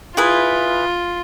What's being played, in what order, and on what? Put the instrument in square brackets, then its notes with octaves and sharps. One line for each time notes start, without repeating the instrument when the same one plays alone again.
[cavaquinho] E4 G#4 B4 [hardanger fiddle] F4